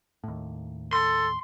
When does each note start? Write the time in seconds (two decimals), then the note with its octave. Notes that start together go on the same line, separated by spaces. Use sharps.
0.24 D#2 A2
0.93 A4 C6